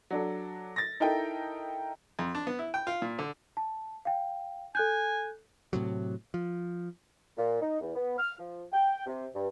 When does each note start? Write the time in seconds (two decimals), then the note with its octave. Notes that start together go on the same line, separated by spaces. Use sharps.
0.11 F#3 D4 A4
0.76 A6 A#6
1.00 D#4 E4 A4 A#4 D#5 G5
2.19 F2
2.35 D4
2.47 B3
2.59 E4
2.74 G5
2.87 F4
3.02 A#2
3.19 D3
3.57 A5
4.05 F5 G5
4.75 A4 G#5 F#6 G6
5.73 A2 C3 F#3
6.34 F3
7.37 A#2
7.62 D#4
7.81 E2
7.95 B3
8.19 F6
8.38 F3
8.73 G5
9.07 C3
9.35 G2